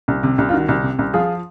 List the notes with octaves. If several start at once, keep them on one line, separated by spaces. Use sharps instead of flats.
C2
C3
C2
F4
D#3 F#4
C2
C3
C2
F3 F4 G#4